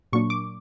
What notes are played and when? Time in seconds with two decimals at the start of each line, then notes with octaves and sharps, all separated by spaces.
0.13 A#2 F#3 A#3 D4 C#6
0.30 D6